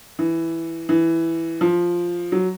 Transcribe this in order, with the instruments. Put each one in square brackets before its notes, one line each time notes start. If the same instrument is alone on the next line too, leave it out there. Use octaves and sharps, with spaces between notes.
[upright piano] E3
E3
F3
F#3